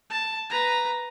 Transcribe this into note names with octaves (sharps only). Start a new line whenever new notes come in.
A5
B4 A#5